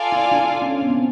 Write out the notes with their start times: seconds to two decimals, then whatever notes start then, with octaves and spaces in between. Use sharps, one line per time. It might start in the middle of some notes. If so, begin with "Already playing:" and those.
Already playing: F4 A4 D5 F5 G#5
0.12 E4
0.32 D4
0.62 C#4
0.82 B3
0.90 C4